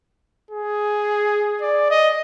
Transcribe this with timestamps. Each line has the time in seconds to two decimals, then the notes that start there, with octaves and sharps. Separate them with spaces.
0.51 G#4
1.61 D5
1.91 D#5